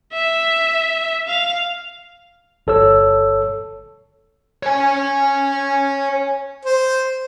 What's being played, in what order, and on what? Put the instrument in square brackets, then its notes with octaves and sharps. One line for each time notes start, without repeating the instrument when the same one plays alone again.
[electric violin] E5
F5
[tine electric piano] G1 A4 C#5 E6
[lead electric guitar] C#5 G#5
[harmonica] C5